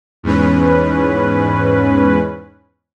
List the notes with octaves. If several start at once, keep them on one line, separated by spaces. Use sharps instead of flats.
E2 G#2 C#4 B4